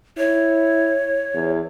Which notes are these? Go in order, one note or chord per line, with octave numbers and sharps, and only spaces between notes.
E4 C#5
E2